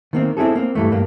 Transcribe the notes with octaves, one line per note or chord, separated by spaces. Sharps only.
D#3 A#3 C4
C4 E4 F#4 G#4 A4
A#3 C4
G2 E3 A3
G2 A#3